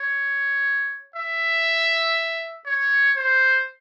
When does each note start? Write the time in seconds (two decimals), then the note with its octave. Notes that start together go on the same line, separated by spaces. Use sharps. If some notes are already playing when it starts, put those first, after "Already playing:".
Already playing: C#5
1.16 E5
2.66 C#5
3.17 C5